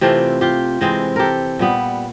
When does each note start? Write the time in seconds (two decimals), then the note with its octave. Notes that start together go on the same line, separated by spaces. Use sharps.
0.01 C3 E3 A3 C4 F4 G4
0.41 F4 G4
0.81 C3 E3 G#3 C4
1.16 G4 A4 A#4
1.59 A#2 G3 B3